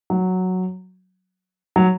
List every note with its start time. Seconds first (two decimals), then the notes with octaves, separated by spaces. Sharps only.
0.10 F#3
1.76 F#3